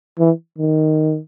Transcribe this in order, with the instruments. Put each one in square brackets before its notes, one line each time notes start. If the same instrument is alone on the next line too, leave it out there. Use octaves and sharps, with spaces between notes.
[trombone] E3
D#3